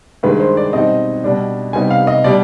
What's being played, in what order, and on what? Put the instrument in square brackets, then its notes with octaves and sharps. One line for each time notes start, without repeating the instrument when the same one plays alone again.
[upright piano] G2 D#3 G#3 B4
C5
D5
B2 G3 C4 D#4 D#5
B2 G3 D4
C3 G3 B3 D#4 G#5
F5
D#5
B2 G3 D4 D5